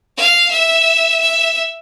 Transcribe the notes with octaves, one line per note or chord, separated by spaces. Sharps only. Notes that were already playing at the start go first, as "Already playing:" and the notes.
F5
E5
E5